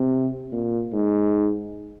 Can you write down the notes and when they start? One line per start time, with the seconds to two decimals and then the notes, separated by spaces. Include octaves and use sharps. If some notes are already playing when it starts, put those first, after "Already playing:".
Already playing: C3
0.52 A#2
0.93 G#2